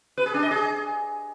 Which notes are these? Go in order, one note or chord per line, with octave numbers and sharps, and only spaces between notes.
B4
G#4
D4
D#5
G#4